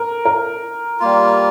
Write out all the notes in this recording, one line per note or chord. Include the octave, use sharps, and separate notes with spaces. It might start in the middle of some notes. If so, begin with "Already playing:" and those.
Already playing: A#4
A#4
G3 A#3 F4